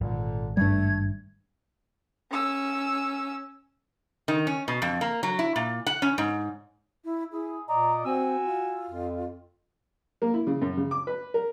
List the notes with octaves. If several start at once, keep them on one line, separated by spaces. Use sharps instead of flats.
G#1 A#2 D3
G2 G3 A3 G#6
C#4 E6
D#3
C#4
B2
F2
A#3
F#3
E4
A#2
F#5
C#4
G#2
E4
E4 G#4
A#2 D5 D#5 A#5
C4 F#4 G#5 E6
F4
F2
A#3
E4
C#3
F#2
C#3
D6
B4
A#4